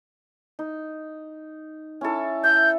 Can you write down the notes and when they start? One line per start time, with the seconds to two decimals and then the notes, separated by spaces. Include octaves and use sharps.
0.59 D#4
2.01 C#4 E4 A4
2.44 E5 G6